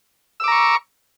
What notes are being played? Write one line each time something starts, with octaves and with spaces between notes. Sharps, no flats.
A#5 C#6 D6 E6